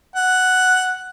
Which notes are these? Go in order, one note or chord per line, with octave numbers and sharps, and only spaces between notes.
F#5